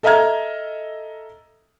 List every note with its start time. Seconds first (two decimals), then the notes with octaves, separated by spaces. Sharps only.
0.03 A4 D#5 E5 A#5 F6 G#6